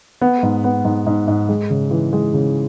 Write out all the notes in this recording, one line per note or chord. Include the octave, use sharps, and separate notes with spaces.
B3
G#2
B3
G#2
G#2
G#2
G#3
C#3
E3
G#3
C#3